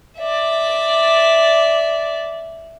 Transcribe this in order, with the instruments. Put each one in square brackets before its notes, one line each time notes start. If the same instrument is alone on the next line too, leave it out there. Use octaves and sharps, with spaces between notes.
[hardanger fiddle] D5 E5